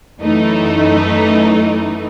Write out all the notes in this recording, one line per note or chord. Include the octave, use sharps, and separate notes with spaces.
F#2 E3 A3 D#4